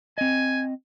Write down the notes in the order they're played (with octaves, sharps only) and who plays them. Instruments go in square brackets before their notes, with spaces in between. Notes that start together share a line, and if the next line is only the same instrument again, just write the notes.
[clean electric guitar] C4 D#5 [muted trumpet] G#5